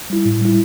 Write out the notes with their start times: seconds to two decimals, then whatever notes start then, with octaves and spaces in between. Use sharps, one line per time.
0.10 G3 E4
0.25 A2
0.41 G3 E4